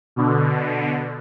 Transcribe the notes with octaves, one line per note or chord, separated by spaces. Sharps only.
B2 D3